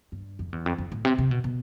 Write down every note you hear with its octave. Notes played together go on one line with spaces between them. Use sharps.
G2
F2
E2
F2
F2
A2
C3
C3
B2
B2